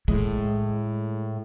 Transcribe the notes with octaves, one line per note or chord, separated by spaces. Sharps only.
A2 G#3